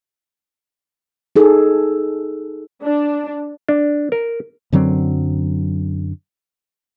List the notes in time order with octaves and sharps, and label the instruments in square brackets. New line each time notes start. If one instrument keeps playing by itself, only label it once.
[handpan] D#4 G#4 A4
[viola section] D4
[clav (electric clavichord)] D4
A#4
[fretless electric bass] F#2 D3 F#3 C4